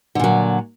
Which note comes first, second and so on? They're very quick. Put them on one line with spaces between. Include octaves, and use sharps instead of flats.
D3 A#2 F#3